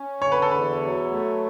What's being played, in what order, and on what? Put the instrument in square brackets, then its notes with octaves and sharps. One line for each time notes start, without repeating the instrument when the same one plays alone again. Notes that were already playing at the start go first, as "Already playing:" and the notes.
Already playing: [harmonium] C#4
[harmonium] D3 [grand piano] C#5
[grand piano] B4
A4
[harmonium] E2 [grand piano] B4
[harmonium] F#3
A3